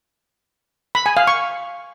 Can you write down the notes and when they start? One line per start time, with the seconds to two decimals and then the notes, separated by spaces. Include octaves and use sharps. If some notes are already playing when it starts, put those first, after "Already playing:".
0.95 B5
1.06 G#5
1.17 F5
1.27 C#6